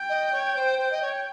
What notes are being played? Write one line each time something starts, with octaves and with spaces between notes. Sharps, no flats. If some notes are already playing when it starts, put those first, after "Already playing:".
Already playing: G5
D#5
C#5
C5
C5
D#5
C#5